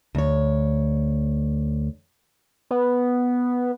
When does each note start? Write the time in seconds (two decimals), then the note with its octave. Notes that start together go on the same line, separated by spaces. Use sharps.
0.15 D2 C#5
2.71 B3